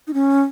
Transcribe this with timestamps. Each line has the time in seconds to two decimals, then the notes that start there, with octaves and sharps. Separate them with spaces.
0.07 D#4
0.14 C#4